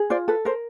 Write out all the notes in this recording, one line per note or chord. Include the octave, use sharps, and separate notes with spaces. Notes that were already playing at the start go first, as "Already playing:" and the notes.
Already playing: G#4
F4 C5 D5
A4 B4
A#4 C5